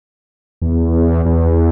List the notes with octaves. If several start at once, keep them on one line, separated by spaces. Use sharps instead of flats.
E2
E2